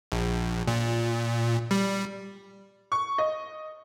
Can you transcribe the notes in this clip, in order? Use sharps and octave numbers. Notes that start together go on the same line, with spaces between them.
A#1
A#2
G3
C#6
D#5